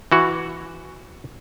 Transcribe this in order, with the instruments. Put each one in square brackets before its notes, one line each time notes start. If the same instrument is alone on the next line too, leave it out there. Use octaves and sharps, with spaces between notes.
[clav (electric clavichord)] E3 F#4